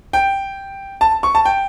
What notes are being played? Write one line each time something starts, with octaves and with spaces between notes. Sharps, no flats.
G5
A5
C#6
A5
G5